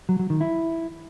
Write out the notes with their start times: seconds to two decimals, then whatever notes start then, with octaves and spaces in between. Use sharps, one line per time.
0.09 F#3
0.19 F#3
0.30 D#3
0.41 E4